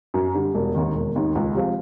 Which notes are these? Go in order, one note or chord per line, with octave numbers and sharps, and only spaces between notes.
F#2
D3 G3
E1
D#2 D#3
E1
D#2 D#3
C#2
C3 F3 G#3